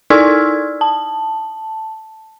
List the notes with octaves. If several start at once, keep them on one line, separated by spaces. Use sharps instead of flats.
D#4 E4 D5 E6 F6 G#6
A5